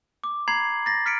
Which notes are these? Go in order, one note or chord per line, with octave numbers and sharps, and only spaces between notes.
D6
A#5 B5 G#6 C7 F#7
A6 A#6
F6 B6 C#7 D7